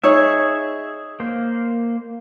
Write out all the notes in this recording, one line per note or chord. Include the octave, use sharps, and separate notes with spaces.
D#4 G#4 C#5 E5
A#3 C5